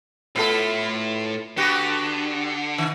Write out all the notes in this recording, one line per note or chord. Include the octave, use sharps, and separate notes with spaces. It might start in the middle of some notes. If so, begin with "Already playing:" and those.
A2 B3 E4 F4 A4
D3 B3 F#4 G4
D#3